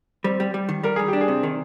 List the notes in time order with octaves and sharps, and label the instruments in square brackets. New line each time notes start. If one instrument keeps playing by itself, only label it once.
[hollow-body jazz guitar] G3 [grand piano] C4
[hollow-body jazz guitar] G3
G3
D#3
[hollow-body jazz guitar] G3 [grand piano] A#4
[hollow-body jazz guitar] G3 [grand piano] G#4
[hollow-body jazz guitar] D4 [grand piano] G4
[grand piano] G#4
[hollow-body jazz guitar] C3
D#3